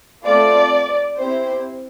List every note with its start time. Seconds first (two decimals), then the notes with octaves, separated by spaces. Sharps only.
0.24 A3 C4 F4 A4 D5
1.17 C4 E4 G4 C5